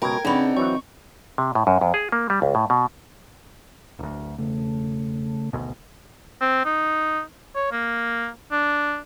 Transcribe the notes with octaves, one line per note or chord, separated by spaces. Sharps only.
C#2 B2 A#4 G5 A#5 G#6
C#3 C4 D4 D#4 B4 D5 F#5
E3 F#3 C#6
C3
A2
F#2
F2
G#4
A#3
G3
C#2
A2
B2
D1 D2
E1 C#3 A3
G#1 D2 B2
C4
D#4
C#5
A#3
D4